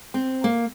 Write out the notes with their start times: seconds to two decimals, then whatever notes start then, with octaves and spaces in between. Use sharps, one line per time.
0.14 C4
0.44 A#3